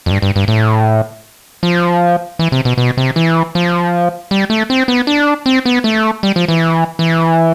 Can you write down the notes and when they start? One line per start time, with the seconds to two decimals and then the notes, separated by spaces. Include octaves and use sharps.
0.06 F2
0.11 G2
0.22 G2
0.36 G2
0.48 A2
1.63 F3
2.39 E3
2.52 C3
2.65 B2
2.78 B2
2.97 C3
3.16 E3
3.55 F3
4.31 G3
4.50 A3
4.70 C4
4.88 B3
5.07 D4
5.46 C4
5.65 B3
5.84 A3
6.23 G3
6.36 F3
6.48 E3
6.99 E3